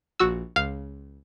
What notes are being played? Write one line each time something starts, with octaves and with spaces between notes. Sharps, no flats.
A#1 F#4 E6
C#2 F5